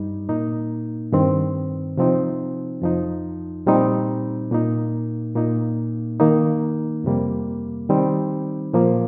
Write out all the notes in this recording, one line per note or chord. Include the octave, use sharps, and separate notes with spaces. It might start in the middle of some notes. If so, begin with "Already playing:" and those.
Already playing: G2 G3 D#4
A#2 A#3 D#4
G2 D#3 C4
C3 F3 C4 D#4
F2 F3 D#4
A#2 G3 C4 D#4
A#2 A#3 D#4
A#2 A#3 D#4
D#3 A#3 D#4
F2 C3 G3 A#3
D#3 G3 C4 D#4
A#2 F3 A#3